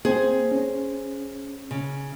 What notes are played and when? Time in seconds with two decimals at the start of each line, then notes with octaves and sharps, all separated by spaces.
0.05 A#3 C4 G#4 C5
0.51 C#4
1.71 C#3